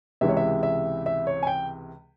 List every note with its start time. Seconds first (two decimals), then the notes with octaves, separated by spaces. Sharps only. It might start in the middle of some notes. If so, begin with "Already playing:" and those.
0.21 C#2 C3 E3 G#3 E5
0.29 C#5
0.37 E5
0.63 E5
1.06 E5
1.27 C#5
1.43 G#5
1.47 G5